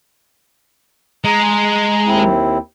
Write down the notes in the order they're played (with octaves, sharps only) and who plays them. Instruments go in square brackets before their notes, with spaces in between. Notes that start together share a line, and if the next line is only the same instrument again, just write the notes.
[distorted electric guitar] G#3 [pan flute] A#5
[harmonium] D#2 C4 E4